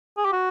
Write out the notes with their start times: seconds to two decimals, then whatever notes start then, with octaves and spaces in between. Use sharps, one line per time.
0.17 G#4
0.25 G4
0.32 F#4